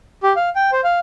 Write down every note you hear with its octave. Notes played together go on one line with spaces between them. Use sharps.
G4
F5
G5
C5
F5